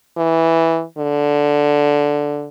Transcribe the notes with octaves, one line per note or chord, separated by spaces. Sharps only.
E3
D3